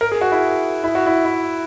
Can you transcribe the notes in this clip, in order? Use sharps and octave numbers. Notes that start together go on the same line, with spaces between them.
A#4
G#4
F#4
E4
E4
F#4
E4
E4